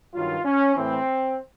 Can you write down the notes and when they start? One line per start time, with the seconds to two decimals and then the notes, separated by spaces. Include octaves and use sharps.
0.14 G2 D#3 F#3 F4
0.45 C#4
0.75 A2 E3 C4